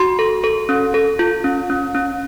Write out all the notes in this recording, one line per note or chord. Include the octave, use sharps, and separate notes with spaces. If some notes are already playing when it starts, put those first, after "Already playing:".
Already playing: F#4 C6
A4
A4
C#4
A4
F4
C#4
C#4
C#4